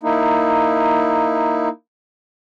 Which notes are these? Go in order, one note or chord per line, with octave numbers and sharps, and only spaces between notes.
A#3 D#4 E4